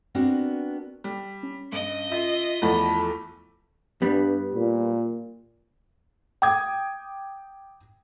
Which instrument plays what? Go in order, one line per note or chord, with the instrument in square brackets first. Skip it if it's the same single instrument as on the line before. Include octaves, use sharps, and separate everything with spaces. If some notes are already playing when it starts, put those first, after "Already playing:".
[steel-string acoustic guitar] B3 C4 D4 F#4 A#4
[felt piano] G3
[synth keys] C#4
[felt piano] G2 [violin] D#5
[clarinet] F4 [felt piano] E5
[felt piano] E2 F3 A3 [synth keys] E4 F#5 A5 [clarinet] B5
[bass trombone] G2 [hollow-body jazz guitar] G3 B3
[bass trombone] A#2
[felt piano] G5 D6 D#6 G#6